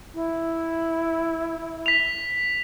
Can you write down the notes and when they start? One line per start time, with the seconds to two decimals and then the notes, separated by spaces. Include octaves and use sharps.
0.14 E4
1.86 B6 F7